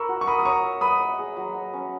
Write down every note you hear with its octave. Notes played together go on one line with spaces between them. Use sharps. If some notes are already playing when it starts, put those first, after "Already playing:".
Already playing: A#4 B5 C#6 E6
F#4
C#6
A#4 B5 D#6
D#6
C#5 A#5 C#6
E5
B4 B5 D#6
D#5
G#4
F#3
D#5
C#4